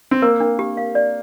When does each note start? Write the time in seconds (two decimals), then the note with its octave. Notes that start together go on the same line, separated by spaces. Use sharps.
0.11 C4
0.22 A#3 A#4
0.40 D4
0.59 G4
0.77 F5
0.95 D5